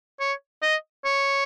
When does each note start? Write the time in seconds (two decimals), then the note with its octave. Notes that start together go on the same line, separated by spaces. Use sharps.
0.20 C#5
0.62 D#5
1.05 C#5